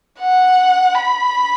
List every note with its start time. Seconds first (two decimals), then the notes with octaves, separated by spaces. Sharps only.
0.20 F#5
0.95 B5